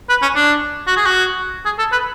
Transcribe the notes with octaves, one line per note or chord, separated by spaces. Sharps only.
B4
C#4
D4
F#4
G#4
F#4
G#4
A4
B4